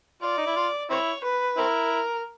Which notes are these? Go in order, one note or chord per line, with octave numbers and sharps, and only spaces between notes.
F4 D5
D#4
E4
F4
C4 E4 C#5
B4
C4 E4 A#4